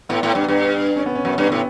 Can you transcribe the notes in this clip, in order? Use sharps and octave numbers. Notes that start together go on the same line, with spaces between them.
A2 B3
A2
G2 B3
G2
C#4
B3
C#4
F#2 B3
G2 B3
A2 B3